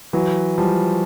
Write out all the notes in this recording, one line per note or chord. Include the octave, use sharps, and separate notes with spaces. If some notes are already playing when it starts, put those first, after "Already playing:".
E3 F#3
F3 G3